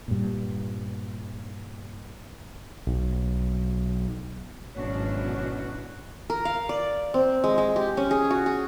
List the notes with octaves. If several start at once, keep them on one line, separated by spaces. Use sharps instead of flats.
G2 A#2
B1
G#1 B2 E3 F#3 C#4 D4 F#4 C#5
A#4
F5
D5
C4
G#3
G#3
G4
C#4
G#4
F#4
G#4